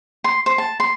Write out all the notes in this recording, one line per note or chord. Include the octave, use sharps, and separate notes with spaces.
C6
C5
A5
C6